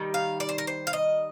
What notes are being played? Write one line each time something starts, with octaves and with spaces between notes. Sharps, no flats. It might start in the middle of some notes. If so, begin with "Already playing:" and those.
Already playing: D#3 G3
F5
D5
C5
A#4
C5
F5
D#5